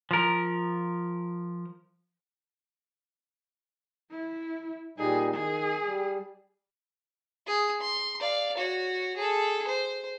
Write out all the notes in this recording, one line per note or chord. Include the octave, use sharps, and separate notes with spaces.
F3 A#4
E4
A#2 G3 D#4 G#4
D#3 G#4
G3
G#4 D#6
C6
D5 F5
F#4 C#5
G#4 A4
C5